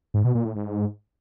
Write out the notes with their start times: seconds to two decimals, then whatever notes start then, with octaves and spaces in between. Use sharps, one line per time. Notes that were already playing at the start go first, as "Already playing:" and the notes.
0.14 G#2
0.24 B2
0.35 A#2
0.45 A2
0.56 G#2